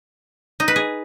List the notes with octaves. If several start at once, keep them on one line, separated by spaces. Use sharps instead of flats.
D#4
B4
G#4